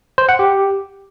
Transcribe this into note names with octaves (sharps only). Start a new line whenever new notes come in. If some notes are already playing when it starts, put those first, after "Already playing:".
C5
F#5
G4